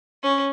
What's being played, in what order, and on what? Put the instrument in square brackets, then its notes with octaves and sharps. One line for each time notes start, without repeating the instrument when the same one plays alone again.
[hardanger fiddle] C#4